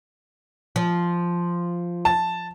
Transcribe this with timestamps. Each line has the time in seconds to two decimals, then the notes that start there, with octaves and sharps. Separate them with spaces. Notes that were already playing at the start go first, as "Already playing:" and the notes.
0.76 F3
2.05 A5